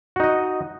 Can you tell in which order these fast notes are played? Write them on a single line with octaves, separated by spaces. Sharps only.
F#4 D#4 D#5